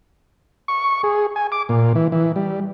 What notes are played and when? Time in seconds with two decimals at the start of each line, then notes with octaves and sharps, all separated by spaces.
0.68 C#6
1.03 G#4
1.36 G#5
1.52 D6
1.69 A#2
1.95 E3
2.12 E3
2.36 G3